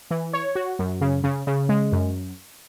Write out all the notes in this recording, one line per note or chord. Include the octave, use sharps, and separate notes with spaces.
E3
C#5
F#4
F#2
C#3
C#3
C#3
G#3
F#2